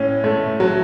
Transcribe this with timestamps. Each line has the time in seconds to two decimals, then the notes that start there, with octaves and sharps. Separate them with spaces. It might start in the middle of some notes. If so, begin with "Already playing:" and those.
Already playing: A2 C#4
0.24 A3
0.60 F#3